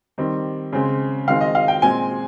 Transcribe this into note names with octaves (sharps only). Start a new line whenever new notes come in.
D#3 G3 C4
C#3 G#3 C4
D#3 G#3 C4 F5
D#5
F5
G5
A#2 G#3 C4 G#5